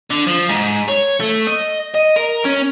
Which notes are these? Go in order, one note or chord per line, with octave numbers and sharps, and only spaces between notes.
D3
F3
G#2
C#5
A3
D#5
D#5
A#4
C#4